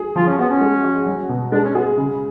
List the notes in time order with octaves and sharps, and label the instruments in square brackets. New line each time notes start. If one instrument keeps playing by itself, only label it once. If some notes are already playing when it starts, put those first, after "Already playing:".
Already playing: [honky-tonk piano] G#4
[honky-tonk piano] F3 [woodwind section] F4
[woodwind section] C#4
[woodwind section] B3 [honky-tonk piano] F#4
[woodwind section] C#4
[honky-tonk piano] G#3
F#4
F#3
B2
[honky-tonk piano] G#3 [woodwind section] D4
[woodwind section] C#4
[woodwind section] B3 [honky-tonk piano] G#4
[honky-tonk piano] C#3